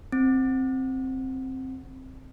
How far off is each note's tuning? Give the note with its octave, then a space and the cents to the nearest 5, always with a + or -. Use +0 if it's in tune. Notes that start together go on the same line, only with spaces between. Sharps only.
C4 +5